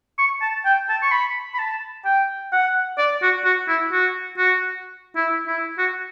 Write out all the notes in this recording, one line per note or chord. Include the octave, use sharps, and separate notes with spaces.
C#6
A5
G5
A5
C#6
B5
B5
A5
G5
F#5
D5
F#4
F#4
E4
F#4
F#4
E4
E4
F#4